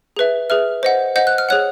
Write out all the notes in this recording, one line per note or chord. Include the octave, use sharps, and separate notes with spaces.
G#4 B4 E5
G#4 B4 E5 F6
C5 D#5 F#5
C5 D#5 F#5 G6
F#6
F6
G#4 C#5 F#5 F#6